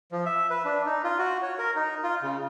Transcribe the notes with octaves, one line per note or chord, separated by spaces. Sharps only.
F3
E5
B4
D4
D#4
F4
F#4
C#5
A#4
D#4
F4
C#3